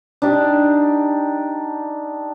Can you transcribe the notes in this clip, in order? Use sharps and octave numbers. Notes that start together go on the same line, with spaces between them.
D4 D#4 G4